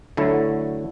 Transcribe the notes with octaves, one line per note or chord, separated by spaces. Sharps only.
D3 F#3 A3 E4